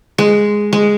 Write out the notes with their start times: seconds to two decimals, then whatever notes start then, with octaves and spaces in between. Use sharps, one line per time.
0.18 G#3
0.73 G#3